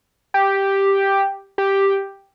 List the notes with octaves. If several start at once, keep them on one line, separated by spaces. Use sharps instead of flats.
G4
G4